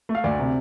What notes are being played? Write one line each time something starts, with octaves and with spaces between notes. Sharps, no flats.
A3
F5
D2 D5
C3